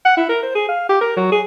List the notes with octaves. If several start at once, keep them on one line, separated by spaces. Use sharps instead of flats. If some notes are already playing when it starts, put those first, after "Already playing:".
F#5
E4
A#4
C5
G#4
F5
G4
A#4
F#3
G#4